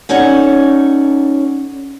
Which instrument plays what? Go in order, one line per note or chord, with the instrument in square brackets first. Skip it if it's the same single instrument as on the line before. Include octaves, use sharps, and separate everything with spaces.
[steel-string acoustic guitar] C#4 D#4 A4 C#5 D5 F#5